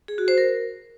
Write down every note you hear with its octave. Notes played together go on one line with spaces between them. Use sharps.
G#4
F#4
C5
A#4